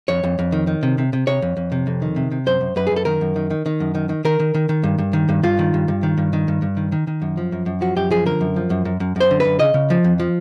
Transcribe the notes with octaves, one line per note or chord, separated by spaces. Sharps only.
F2 C#5
F2
F2
D#3
D#3
C3
C3
C3
C3 C#5
F2
F2
C3
F2
D#3
C3
C3
F#2 C5
F#2
F#2 B4
G#4
F#2
A4
D#3 A#4
F#2
D#3
D#3
D#3
F#2
D#3
D#3
D#3 A#4
D#3
D#3
D#3
G2
G2
D#3
G2
G2 F4
D#3
G2
G2
D#3
G2
D#3
G2
G2
D#3
D#3
D#3
F#2
F3
F#2
F#2
F3 F#4
F#2 G4
F3 G#4
D3 A#4
F#2
F3
F#2
F#2
F#2
F#2 C5
D3
F#2 B4
C#3 D#5
C#3
F3
F2
F3